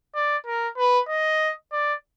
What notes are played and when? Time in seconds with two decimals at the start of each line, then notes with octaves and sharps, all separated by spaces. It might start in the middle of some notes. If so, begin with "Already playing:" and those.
0.15 D5
0.47 A#4
0.78 B4
1.09 D#5
1.72 D5